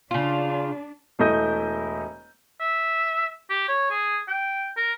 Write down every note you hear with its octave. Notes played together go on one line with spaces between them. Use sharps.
C#3 D4 F4
E1 A3 E4 D#5 G6 D#7
E5
G4
C#5
G#4
G5
A#4